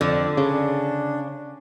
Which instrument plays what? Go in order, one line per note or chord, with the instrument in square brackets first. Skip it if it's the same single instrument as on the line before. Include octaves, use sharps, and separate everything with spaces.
[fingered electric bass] F2 [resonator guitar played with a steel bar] D3
[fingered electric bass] C#3 [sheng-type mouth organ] D4